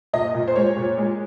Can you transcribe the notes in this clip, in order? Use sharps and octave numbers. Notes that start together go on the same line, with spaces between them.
A#2 D#5
A#2
C5
G#3 C#5
A#2
G#3